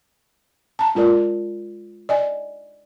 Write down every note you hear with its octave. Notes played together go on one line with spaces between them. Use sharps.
A5 A#5
G#3 F4 A#4 D5
D5 D#5 G#5